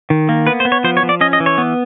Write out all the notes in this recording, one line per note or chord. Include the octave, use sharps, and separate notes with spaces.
D#3
A#3
B3 B4
C5
B3
C#5
F3 C5
C#5
F3
D5
C#4 D#5
D#5
E3
C#5
B3